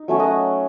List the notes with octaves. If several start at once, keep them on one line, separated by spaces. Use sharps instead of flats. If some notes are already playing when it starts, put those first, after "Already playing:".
Already playing: D#4
F#3 A3 C#4
D#5 F#5